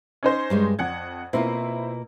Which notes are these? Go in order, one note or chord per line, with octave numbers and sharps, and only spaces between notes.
C#4 D#4 C5
G2 G3 G#3
F2 D5 F#5 G#6
B2 A#3 C4 E4 F4